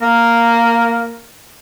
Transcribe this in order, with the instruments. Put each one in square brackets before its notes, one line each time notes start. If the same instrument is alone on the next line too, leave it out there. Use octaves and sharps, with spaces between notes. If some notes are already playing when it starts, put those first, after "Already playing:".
[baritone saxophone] A#3 [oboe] A#4